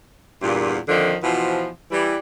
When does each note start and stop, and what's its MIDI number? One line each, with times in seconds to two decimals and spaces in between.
0.42 0.78 40
0.42 0.78 43
0.42 0.78 46
0.89 1.15 41
0.89 1.15 50
0.89 1.15 51
0.89 1.15 53
1.23 1.70 47
1.23 1.70 52
1.23 1.70 53
1.91 2.17 52
1.91 2.17 55